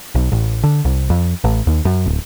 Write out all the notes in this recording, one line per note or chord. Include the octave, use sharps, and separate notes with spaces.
B1
A1
D3
C2
F2
A1
D#2
F#2
D1